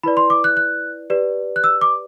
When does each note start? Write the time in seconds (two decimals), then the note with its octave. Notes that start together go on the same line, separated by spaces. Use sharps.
0.03 E4 B4 D5 B5
0.17 C6
0.30 D6
0.44 F#6
0.57 F#6
1.10 G4 B4 D5
1.56 F#6
1.64 E6
1.81 D6